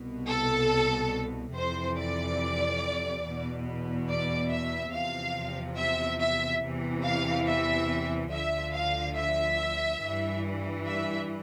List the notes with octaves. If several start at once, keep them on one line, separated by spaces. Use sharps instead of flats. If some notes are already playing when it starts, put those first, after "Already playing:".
Already playing: C2 B2
A4
F2 C3 E3 C5
D5
E2 B2
D5
E5
E2 C3 F3 F5
E5
E5
E2 C3 E3
F5
E5
D2 D3 F3 E5
F5
E5
G2 E3
E5